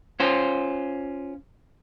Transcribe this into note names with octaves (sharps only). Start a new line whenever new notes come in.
C#4 F4 C5